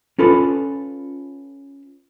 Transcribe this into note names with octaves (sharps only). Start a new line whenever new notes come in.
C#4 F4 A4 B4